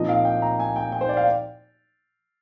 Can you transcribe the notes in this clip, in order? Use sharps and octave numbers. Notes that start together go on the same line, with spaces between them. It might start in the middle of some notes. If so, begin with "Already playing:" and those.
Already playing: A#2 F3 C4 D#4 D#5
F5
G5
A#5
G#5
G5
G5
C5
D5
F5